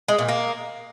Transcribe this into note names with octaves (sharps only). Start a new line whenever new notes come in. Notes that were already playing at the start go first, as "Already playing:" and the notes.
G#3
A#2
A#3